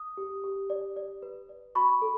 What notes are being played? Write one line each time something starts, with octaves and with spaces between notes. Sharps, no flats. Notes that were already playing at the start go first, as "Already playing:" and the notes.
Already playing: D#6
G4
G4
D5
D5
B4
D5
F#4 B5 C#6
A4